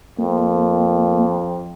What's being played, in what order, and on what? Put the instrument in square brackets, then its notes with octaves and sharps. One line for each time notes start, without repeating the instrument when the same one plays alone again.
[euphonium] F2 [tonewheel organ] A#3